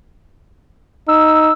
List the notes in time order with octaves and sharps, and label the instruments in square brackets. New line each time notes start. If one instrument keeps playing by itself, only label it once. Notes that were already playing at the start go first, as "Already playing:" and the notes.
[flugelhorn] D#4 [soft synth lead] E6